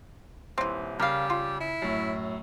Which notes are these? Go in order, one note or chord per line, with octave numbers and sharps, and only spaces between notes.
D#1 E3 C4
C#3 G3 A#4 F5 F6
F4
E4
F#2 A2